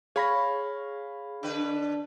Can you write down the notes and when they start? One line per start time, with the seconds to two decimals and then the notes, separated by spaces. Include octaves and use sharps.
0.16 G#4 C#5 F5 B5 A#6
1.43 D3 D4 B4